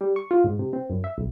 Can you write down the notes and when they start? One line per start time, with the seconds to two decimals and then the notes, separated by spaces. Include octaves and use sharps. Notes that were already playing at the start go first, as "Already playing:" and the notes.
0.01 G3
0.16 C#6
0.31 F4
0.44 G#2
0.59 C3
0.73 C4
0.90 F#2
1.04 E5
1.18 B1